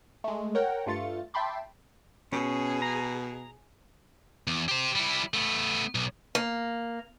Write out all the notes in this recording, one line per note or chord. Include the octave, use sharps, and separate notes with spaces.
G#3 A3
A#4 C#5 F#5 G5
G2 A3 F4 A6 C#7
E5 G5 A5 B5 C6 D6
B2 C#4 G#4
A#5
E2
G4 C5
G3 E4
A3 B3
B1
A#3